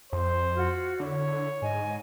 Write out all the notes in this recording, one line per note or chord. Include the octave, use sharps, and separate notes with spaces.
F2 C5
F4 F#4
D3 E4 C#5
G#2 D#5 G#5